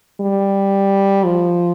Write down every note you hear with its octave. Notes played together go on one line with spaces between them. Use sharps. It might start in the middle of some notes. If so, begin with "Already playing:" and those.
G3
F3